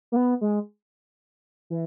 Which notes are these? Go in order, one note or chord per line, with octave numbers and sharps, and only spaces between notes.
A#3
B3
G#3
E3